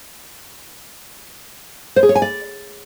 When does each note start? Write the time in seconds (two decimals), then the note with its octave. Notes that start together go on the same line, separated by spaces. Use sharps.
1.96 C5
2.03 G#4
2.09 C#5
2.15 G#5
2.22 D5